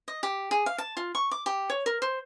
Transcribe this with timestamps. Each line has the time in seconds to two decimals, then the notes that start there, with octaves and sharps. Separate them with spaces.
0.08 D#5
0.23 G4
0.51 G#4
0.66 F5
0.78 A5
0.97 F4
1.15 C#6
1.31 D6
1.46 G4
1.70 C#5
1.86 A#4
2.02 C5